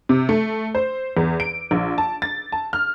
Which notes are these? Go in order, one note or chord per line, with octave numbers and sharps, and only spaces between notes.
C3
A3
C5
E2
D7
A#1
A5
A6
A5
F6